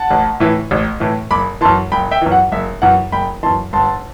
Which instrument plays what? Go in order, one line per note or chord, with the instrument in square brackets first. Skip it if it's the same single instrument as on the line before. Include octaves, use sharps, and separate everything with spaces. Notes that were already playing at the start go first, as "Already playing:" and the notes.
Already playing: [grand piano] F#5 A5
A1
A2 E3
A1
A2 E3
F#1 B5 D6
F#2 E3 A5 C6
F#1 G5 B5
E5 G5
F#2 E3
F#5
F#1 E5
F#2 E3 F#5
F#1 G5 B5
F#2 E3 A5 C6
G1 A5 C6